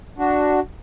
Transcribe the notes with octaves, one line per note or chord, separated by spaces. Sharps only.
D4 F#4